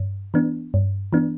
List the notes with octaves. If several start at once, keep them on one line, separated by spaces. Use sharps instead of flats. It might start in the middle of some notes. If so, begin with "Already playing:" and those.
Already playing: G2
E3 B3 D4
G2
E3 B3 D4